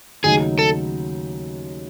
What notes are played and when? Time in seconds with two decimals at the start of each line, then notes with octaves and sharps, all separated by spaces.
0.24 D#2 C#3 F#3 A3 D#4 G#4
0.59 A4